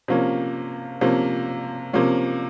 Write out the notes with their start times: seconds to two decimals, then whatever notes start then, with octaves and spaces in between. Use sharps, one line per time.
0.08 C3 F3 A#3 C#4
1.01 C3 F3 A#3 C#4
1.93 C3 F3 A#3 C#4